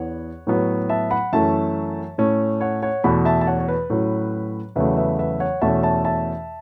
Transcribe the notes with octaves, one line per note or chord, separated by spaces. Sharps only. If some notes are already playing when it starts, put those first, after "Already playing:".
Already playing: E2 E3 B3 C#5 F#5
A2 F#3 B3
E5 A5
F#5 B5
F#2 E3 A3 C#4 E5 A5
A2 A3 C#4
C#5 F#5
C#5 F#5
E2 B2 A3 F#5 B5
E5 A5
A5
C#5 F#5
C#5
B4
A2 F#3 C#4
E2 C#3 F#3 A3 B4 E5
B4 E5
B4 E5
C#5 F#5
E2 B2 A3 C#4 E5 A5
E5 A5
E5 A5